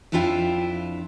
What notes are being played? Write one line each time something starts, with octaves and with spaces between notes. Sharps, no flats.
F2 D4 E4 F4 E5 G5